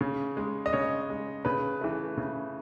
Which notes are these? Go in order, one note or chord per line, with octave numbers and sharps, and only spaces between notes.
C#3
G#3
D#5
C#3 C#5
G#3
C#3 B4
E3 A3
C#3